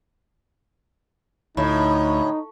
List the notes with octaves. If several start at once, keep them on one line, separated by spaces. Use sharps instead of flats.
D2 A2 D#4 B5